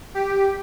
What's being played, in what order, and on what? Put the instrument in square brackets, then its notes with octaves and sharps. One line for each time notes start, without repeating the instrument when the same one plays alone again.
[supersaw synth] G4